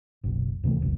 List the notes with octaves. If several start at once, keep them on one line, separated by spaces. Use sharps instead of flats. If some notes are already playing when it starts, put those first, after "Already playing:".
F#1 B1
D2 C3 E3 A3
F#1 C#2